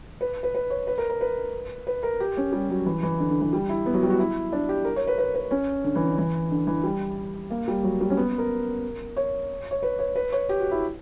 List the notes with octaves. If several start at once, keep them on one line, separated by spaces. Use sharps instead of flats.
B4
B4
B4
C#5
B4
A#4
A#4
B4
B4
A#4
G4
C#4
G3
F#3
E3
E3
D3
D3
E3
G3
E4
B3
F#3
G3
F#4
E4
D4
G4
A#4
C#5
B4
B4
B4
C#4
D3
E3
D3
E3
D3
E3
G3
A#3
G3
F#3
G3
C#4
B3
A#4
C#5
C#5
B4
C#5
B4
C#5
G4
F#4
E4